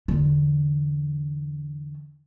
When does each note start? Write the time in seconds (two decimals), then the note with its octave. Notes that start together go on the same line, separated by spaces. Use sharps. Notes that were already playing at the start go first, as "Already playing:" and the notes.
0.08 E2 D3